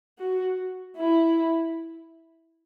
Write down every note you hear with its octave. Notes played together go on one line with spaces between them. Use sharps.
F#4
E4